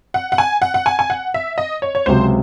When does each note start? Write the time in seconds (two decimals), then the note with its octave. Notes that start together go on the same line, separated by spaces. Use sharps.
0.14 F#5
0.32 F#5
0.38 G#5
0.62 F#5
0.74 F#5
0.86 G#5
0.99 G#5
1.10 F#5
1.34 E5
1.58 D#5
1.82 C#5
1.95 C#5
2.06 C#2 C3 F#3 C5